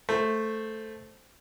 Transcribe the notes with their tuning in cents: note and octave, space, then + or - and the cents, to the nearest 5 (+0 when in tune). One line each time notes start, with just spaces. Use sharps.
A3 +0 C5 +0